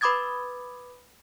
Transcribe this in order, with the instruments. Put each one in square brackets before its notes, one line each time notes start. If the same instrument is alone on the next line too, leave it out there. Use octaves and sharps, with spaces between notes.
[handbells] B4 B5 D6 D#6 G#6 A6